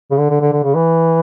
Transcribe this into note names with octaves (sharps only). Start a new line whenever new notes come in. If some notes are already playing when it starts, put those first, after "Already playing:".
C#3
D3
D3
D3
D3
C#3
E3